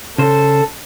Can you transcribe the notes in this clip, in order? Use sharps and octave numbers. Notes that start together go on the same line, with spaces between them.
C#3 A4 C5